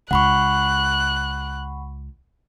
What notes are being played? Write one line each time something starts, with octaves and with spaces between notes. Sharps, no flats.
C#2 F#5 B5 C#6 F#6